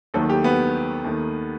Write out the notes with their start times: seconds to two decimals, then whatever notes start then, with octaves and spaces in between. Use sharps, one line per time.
0.14 D#2 D#3 F#3 A3 A4
0.30 G4
0.44 B3
1.04 D#2 D#3 A3